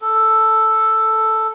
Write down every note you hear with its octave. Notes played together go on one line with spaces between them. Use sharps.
A4